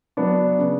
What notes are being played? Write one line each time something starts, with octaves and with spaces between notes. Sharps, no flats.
F#3 B3 D4
C#3